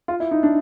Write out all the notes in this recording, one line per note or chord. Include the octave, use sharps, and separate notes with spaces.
F4
E4
D#4
D4